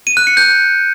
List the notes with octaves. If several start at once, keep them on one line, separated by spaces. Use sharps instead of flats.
D#7
F#6
C#7
G6